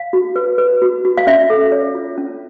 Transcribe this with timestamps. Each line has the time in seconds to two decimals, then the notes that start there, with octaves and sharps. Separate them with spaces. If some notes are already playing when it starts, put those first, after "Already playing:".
Already playing: F5
0.13 F#4
0.36 B4
0.58 B4
0.82 F#4
1.05 F#4
1.17 F5
1.27 C#4 E5
1.50 A4
1.72 C#5
1.95 F4
2.18 C#4